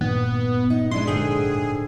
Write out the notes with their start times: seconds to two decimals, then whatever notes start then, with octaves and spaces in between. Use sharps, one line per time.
0.01 G2 A#2 D#3 B3
0.70 D#4
0.91 G#3 D4 E4 C6
1.07 G#2 D3 G#4 G5